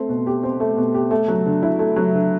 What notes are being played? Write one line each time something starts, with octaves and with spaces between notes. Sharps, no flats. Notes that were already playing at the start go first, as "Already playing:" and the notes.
Already playing: A3 C4
B2
G4
C4
A3
B2
G4
A3
F#3
D3
E4
A3
F#3
D3